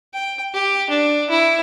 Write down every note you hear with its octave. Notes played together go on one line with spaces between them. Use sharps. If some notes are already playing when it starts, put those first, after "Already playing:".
G5
G4
D4
E4